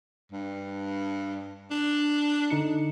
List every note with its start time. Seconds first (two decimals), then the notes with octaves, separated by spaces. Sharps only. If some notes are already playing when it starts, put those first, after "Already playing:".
0.32 G2
1.71 D4
2.50 D3 D#4 C#7